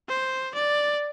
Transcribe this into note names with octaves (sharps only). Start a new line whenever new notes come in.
C5
D5